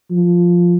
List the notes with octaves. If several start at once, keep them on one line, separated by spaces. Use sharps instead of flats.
F3